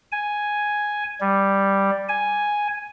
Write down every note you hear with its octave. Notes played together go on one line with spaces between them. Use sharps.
G#5
G3
G#5